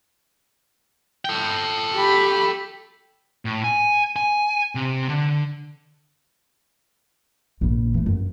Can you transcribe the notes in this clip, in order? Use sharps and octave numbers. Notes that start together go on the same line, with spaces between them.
A4 G5
G4 B5
A2
G#5
G#5
C3
D3
A#1 C#3
E3 A3
F#2